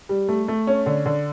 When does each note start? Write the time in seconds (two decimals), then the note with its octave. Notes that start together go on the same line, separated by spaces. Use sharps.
0.09 G3
0.28 A3
0.48 A3
0.67 C#4
0.86 D3
1.06 D3